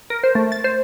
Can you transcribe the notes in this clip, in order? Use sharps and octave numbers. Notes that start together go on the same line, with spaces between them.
A#4
C5
A3
A6
C5